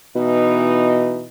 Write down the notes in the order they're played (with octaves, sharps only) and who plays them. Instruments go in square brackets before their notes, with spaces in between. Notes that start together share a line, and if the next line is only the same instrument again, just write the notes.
[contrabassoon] B2 [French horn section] E3 D#4